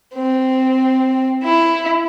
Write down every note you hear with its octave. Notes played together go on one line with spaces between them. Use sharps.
C4
E4